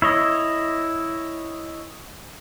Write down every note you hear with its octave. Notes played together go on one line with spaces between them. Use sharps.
E4 C#5 D#5